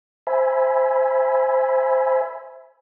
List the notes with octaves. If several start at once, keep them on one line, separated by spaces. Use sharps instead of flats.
C5 E5 G#5 B5